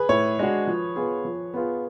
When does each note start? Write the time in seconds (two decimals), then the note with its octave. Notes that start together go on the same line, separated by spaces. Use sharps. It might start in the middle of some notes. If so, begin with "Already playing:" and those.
Already playing: G#4 B4
0.09 A2 C#5
0.39 G#3 D4 F#4
0.67 F3
0.96 B3 F4 G#4
1.25 F3
1.54 B3 F4 G#4